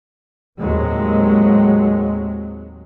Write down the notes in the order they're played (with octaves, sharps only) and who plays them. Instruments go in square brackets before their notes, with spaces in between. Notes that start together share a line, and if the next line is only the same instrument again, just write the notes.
[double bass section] D#2 A2 F#3 G#3 C4